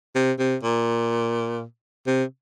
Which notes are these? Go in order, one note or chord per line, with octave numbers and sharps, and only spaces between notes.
C3
C3
A#2
C3